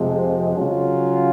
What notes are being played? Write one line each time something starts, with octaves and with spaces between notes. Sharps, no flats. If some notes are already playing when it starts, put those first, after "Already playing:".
Already playing: F2 C3 F3 G#3
C#3 F#3 C#4 F4